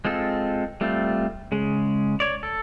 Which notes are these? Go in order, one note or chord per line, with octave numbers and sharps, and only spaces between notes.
G#3 C4 F4 A4
G3 A3 C4 F4
C#3 G#3
C#5 D5
A4